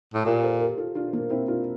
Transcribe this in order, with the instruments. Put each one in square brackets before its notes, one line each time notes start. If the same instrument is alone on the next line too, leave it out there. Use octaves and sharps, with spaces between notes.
[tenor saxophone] A2
[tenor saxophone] A#2 [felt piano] G4 A#4
[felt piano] A4 C5
G4 A#4
F4 A4
D4 F4
A#3 D4
C4 E4
D4 F4